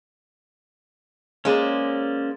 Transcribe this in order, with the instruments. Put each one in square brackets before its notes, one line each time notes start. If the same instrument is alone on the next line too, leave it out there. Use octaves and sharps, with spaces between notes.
[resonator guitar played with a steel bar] G#3 A#3 [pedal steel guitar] C#4 C5 D5